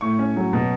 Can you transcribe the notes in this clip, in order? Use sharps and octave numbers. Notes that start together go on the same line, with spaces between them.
A2 C#6
C#4
F#3
B2